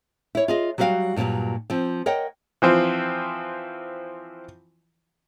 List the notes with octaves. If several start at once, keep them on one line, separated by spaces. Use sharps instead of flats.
E4 C#5
F4 G#4 D#5
F#3 G3 F#4 A#4 F5 G5
G2 A#2 E3 F#3 G3
F3 C4
A#4 C#5 D#5 F#5 G5
E3 F3 C4